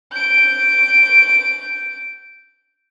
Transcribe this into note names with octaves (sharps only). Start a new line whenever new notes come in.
G6 D7